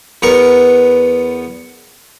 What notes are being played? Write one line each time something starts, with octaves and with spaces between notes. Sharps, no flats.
E2 B3 A#4 C#6